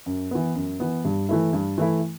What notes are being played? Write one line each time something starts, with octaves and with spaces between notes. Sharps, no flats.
F#2
E3 B3
F#2
E3 B3
G2
E3 A3 E4
G2
E3 A3 E4